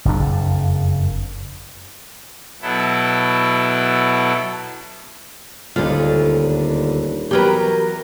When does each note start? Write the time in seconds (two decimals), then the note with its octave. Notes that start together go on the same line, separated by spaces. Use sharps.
0.05 F#1 F2 D4
2.62 B2 F#3 E4 A4
5.76 D#1 D2 D3 G#3 F4
7.31 E2 F#3 G4 A#4 B4 A#5